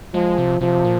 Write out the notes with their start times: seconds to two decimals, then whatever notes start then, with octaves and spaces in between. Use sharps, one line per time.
0.14 F3 G#3
0.38 C3
0.61 C3 F3
0.85 A#2